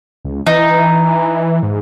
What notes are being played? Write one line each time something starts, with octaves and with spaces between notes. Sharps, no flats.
C#2
E3 D#4
G#2